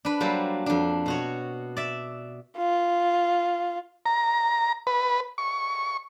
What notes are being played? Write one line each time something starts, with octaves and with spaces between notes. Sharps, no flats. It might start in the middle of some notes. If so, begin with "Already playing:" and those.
D4 B4
F#3 G3 A#3 A4 C5
F2 D4
B2 F#4 C#5
D5 E5
F4
A#5
B4
C#6